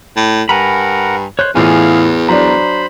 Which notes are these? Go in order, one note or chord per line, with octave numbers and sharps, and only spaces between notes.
A2
G2 A#4 F#5 G#5 A#5 B5
C5 C#5 F#6 G6
E2 A2 E3 F4 G#4 F5 G#5
F#3 D4 C5 A#5 B5